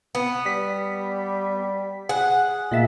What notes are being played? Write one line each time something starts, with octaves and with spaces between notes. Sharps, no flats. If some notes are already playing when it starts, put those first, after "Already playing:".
B3
G3 B6
G#4 F#5
A#2 G#3 A#3 E5